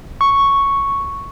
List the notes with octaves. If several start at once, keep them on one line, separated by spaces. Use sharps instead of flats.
C#6